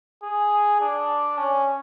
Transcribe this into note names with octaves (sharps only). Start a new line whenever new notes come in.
G#4
D4
C#4